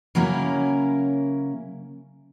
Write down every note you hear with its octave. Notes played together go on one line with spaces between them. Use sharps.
C#3 F#3 A#3 C#4 E4 A#4